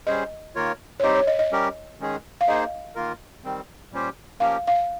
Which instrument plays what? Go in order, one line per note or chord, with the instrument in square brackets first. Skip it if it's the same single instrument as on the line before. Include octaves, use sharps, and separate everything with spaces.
[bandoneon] G3 C#4 G#4 C5 [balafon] D#5
[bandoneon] D#3 A#3 F4 A#4 C#5
[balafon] C#5
[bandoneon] G3 C4 D#4 G4 C5 [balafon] D#5
[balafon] C#5
D#5
D#5
[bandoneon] G3 C#4 G4 A#4
D#3 G#3 C#4 G#4
[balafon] F5
[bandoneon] A#3 D#4 G#4 C5 [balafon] D#5
[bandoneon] D#3 A#3 F4 A#4
D#3 G3 C4
A#2 G3 C#4 G4 C5
[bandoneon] F3 A#3 C#4 G4 A#4 [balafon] F5
[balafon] F5